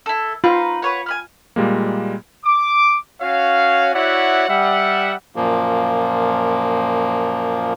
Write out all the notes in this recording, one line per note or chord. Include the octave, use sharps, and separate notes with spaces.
E4 A4
D#4 F4 B4
B4 C#5 F#5
G#5 B5 F6
A#2 G3 G#3 A#3
D6
C#4 F#4 C#5 F5
E4 F#4 C#5 D5 E5 F#5
G3 E5 F#5
F#2 A#2 F3 A#3